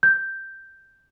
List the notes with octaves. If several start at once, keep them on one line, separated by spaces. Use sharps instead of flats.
G6